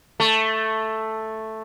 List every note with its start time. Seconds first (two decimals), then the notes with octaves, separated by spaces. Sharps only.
0.20 A3